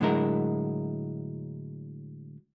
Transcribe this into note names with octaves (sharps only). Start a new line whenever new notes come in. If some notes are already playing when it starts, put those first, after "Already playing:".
A2 D3 F#3 G#3 E4 A#4